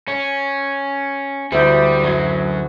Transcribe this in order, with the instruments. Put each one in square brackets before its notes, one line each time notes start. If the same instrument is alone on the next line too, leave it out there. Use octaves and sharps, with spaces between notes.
[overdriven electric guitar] C#4
[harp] D2 E4 G6 [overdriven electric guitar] G3
[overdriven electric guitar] F#2 F#3